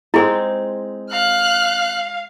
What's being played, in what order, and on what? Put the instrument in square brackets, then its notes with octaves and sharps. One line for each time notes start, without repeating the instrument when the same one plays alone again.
[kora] G#3 C4 D#4 [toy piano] E4 G#4
[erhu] F5 [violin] F6 F#6